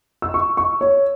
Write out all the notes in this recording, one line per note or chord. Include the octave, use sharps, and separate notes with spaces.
E6
C#6
C#6
C#5